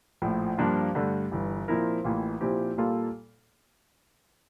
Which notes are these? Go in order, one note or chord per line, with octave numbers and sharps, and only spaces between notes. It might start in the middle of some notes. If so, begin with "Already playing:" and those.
A#1 A2 F3
G2 F3 A#3 D4 F4
G2 D3 A3
G1 G2 E3
A#2 F3 C4 E4 A#4
A1 A2 E3 A#3 F4
A#2 F3 C4 E4 G4
A#2 G3 A#3 F4 A4